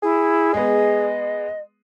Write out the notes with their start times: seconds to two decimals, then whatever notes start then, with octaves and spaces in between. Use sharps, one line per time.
0.03 E4 G#4
0.54 G#3 B3 D#5